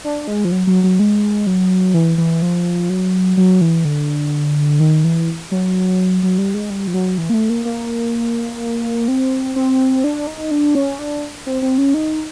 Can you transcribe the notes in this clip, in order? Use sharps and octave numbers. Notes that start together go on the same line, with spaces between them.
D4
G#3
F3
F#3
F#3
F#3
G#3
F#3
E3
E3
F3
F#3
F#3
E3
D3
D#3
E3
F#3
F#3
G3
G#3
G3
F3
F#3
E3
A#3
A3
A#3
A#3
C4
C4
D4
D#4
D4
C#4
D4
C4
C4
C#4
D#4